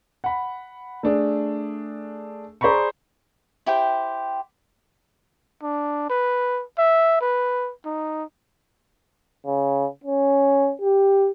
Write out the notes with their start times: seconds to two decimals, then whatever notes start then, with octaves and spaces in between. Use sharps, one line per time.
0.24 F#5 B5
1.03 A3 D4 G#4
2.61 G#4 C5 D5 A#5 B5 C#6
3.66 E4 G4 C5 G5
5.63 D4
6.10 B4
6.78 E5
7.21 B4
7.85 D#4
9.46 C#3
10.04 C#4
10.81 G4